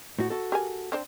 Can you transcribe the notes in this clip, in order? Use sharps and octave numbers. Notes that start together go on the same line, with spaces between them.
A2 F#4
F#4 A4
G4 A#4 G#5
C4 D4 C5